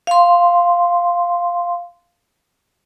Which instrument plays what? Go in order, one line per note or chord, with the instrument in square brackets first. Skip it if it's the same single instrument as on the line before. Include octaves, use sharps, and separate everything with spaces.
[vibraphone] F5 C6